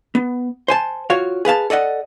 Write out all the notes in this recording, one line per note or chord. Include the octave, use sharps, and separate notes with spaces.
B3
C5 G#5 A5
F4 F#4 C#5 F5
G#4 B4 F5 A5
A4 D5 D#5 F#5